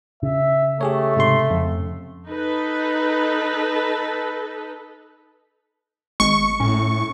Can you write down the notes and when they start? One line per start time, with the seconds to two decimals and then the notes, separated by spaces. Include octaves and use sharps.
0.23 C#3 E5
0.81 A3 G4 G#4 C#5
1.17 G#2 C3 C6
1.50 F2
2.26 D#4 A4 B4
6.20 G#1 G#3 C#6
6.60 A2 C#4